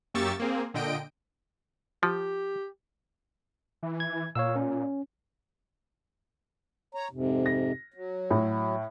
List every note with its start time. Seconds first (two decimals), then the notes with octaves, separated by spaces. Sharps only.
0.14 F#2 A#3 G4 C#6 E6 A6
0.40 A#3 C4 G#4
0.74 A#2 D3 D#5 G5 D7
2.03 F3 G4
3.83 E3
4.00 G#6
4.35 A#2 C#5 F5 E6
4.56 C#4
6.95 C#5 A#5
7.11 F2 G#2 C3
7.46 A#6
7.94 F#3
8.31 A2